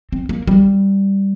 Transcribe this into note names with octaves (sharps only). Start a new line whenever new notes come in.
C4
A#3
G3